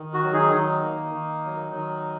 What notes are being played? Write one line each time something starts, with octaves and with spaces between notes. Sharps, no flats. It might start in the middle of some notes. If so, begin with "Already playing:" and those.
Already playing: D#3
F#4
F#3
D#4 G#4
D#3 D#4
A#3
D#3
F#3
D#3